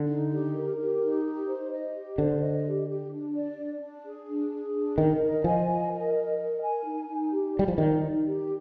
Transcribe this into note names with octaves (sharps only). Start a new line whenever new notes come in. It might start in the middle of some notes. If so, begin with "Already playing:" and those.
Already playing: D3
D#4
G4
A#4
G4
D#4
G4
C5
D#5
G4
D3 C5
D#5
G4
G4
D4
D5
D4
D4
G#4
D4
G#4
D4
D#3 A#4
D#5
F3 G#5
D#5
A#4
D#5
A#4
G#5
D#4
D#4
G4
D5
G3
F3
D#3 D5
D#4
G4